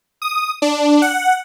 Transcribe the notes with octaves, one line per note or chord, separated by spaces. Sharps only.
D#6
D4
F#5